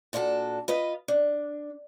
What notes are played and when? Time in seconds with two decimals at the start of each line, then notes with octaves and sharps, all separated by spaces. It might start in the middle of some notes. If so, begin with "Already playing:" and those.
0.13 A#2 D4 E4 F#4 A4
0.68 F4 B4 D#5
1.08 D4